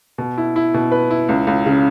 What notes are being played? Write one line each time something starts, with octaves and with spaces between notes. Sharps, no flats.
B2
E4
E4
B2
B4
E4
C#2
C#2
C#3